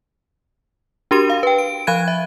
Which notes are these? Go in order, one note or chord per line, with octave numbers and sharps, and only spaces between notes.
D4 F#4 G4 A#4 C6 D#7
F5
B4 G5
D7
F3 F5 B5 F#6 G#6 D#7
E5